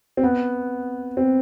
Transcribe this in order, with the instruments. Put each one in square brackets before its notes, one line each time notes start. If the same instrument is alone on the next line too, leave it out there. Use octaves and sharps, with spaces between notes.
[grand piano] C4
B3
C4